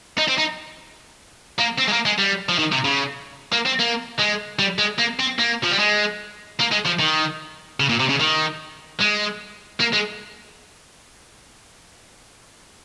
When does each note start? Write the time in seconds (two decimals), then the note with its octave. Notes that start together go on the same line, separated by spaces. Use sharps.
0.19 D#4
0.28 C4
0.38 D#4
1.58 A#3
1.78 C4
1.88 G#3
1.92 A#3
2.06 G#3
2.19 G3
2.49 F3
2.59 D#3
2.72 C3
2.85 C#3
3.52 A#3
3.65 C4
3.79 A#3
4.19 G#3
4.59 G3
4.78 G#3
4.99 A#3
5.19 C4
5.39 A#3
5.64 F3
5.71 G3
5.79 G#3
6.60 A#3
6.72 G#3
6.86 F3
7.00 D#3
7.80 C#3
7.89 A#2
8.00 C3
8.09 C#3
8.20 D#3
9.00 G#3
9.80 A#3
9.93 G#3